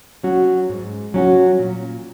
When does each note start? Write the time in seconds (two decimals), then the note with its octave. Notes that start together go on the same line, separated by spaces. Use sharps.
0.23 F#3 C#4 F#4
0.69 G#2
1.14 F#3 C#4 F#4
1.59 A#2